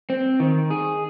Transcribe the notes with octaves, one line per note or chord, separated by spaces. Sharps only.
C4
D#3
G#4